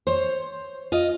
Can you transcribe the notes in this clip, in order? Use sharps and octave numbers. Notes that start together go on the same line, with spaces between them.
C5 C#5
F4 D#5